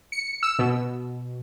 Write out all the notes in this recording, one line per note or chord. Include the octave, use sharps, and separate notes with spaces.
C#7
E6
B2